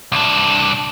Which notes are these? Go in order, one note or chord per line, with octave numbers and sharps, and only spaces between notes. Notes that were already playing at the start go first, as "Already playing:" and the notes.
C2 D4